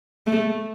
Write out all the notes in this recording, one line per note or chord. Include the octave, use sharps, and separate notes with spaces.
A3